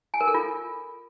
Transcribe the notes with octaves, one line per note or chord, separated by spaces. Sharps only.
G#5
A#4
A4
F4